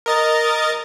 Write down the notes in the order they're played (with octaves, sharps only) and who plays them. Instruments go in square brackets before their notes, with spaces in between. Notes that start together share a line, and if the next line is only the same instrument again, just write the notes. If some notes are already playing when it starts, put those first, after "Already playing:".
[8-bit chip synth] A#4 D#5 A6